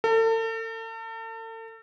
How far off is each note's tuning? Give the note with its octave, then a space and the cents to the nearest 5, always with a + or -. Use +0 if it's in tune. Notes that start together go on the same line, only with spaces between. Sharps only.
A4 +40